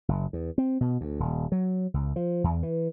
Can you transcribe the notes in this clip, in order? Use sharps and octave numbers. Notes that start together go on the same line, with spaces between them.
F#1
E2
C4
B2
D2
D#1
F#3
C#2
F3
E2
E3